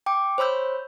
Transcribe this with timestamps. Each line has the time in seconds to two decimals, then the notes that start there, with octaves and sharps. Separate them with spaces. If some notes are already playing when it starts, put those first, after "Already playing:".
0.06 G5 D6
0.38 C5 C#5 B5 E6 G6